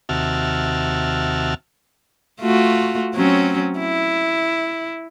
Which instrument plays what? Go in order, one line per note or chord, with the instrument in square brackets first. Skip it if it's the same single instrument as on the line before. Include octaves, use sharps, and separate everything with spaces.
[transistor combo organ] D#2 C3 F#4 E5 A5 F6
[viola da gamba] A3 F4 F#4
F#3 C4 C#4
E4